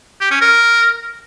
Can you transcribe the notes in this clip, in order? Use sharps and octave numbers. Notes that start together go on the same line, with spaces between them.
G4
C#4
A#4